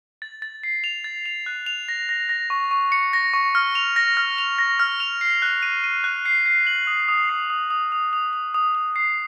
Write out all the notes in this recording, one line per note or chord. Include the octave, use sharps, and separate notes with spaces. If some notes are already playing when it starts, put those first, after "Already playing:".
A6
A6
C7
F7
A6
F7
F#6
F7
A#6
A#6
A#6
C#6
C#6
C#7
A#6
C#6
F6
F7
A#6
F6
F7
A#6
F6
F7
C7
F#6
D#7
D#7
F#6
C7
C7
F#7
D#6
D#6
C7
D#6
D#6
D#6
D#6
D#6
D#6
D#6
C7